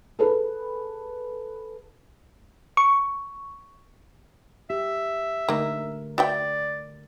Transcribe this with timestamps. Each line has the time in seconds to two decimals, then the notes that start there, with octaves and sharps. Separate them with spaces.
0.19 G#4 A4 B4
2.77 C#6
4.70 G4 E5
5.49 D3 A3 A#3 D#4 A#4
6.18 F#4 D5 E5 G5